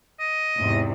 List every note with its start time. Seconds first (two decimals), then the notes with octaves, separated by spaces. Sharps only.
0.20 D#5
0.56 E2 G#2 C3